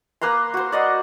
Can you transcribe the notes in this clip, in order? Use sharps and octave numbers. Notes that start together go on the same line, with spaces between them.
A#3 B4 A#5 C6
F#4 C5
D5 D#5 F#5